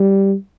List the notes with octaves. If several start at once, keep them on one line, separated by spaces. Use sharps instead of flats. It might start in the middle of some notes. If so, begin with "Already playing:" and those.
Already playing: G3